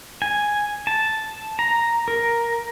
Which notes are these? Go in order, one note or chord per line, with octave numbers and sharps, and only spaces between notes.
G#5
A5
A#5
A#4